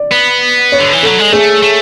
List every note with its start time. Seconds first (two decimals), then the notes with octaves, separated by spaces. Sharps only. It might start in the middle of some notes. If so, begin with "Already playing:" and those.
Already playing: D5
0.12 B3
0.72 C#5
0.79 D3
0.92 E3
1.03 F#3 A4
1.19 G#3
1.32 A3 G#4
1.62 A3